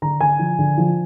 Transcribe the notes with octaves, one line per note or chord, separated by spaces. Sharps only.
D3 A#5
D3 G#5
F3
D3
F3